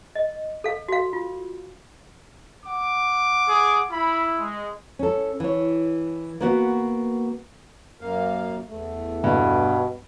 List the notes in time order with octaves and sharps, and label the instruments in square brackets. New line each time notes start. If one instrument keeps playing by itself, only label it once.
[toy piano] D#5
A4 F5
F#4 F5
F4
[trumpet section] F#5 D6
[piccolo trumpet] G#4
[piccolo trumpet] E4 [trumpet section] B5
[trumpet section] G#3
[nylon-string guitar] C#4 A4
E3 C#5
A#3 B3 F#4 B4 F5 F#5
[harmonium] F#2 A#3 F5
E2 A3
[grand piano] G2 [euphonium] B2